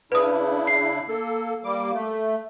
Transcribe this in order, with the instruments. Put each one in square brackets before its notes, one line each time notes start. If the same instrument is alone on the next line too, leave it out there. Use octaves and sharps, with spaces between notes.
[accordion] C#3 D4 E4 [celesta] B4 D#6
[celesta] C7
[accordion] A#3 A4
G3 A#3 D6
A3